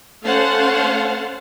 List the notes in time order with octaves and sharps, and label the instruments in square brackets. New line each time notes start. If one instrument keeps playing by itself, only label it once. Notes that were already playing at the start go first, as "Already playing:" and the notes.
[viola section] A3 C#4 C5 F5 F#5 A5